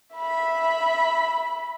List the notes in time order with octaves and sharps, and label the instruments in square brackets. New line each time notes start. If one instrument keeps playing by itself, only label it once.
[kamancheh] E5 B5